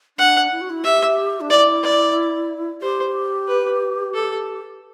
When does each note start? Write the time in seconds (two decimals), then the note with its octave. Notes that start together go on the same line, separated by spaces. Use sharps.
0.18 D4 F#5
0.52 E4
0.61 F#4
0.70 E4
0.84 G4 E5
1.41 D4
1.50 E4 D5
1.83 D5
2.82 G4 C5
3.48 B4
4.14 A4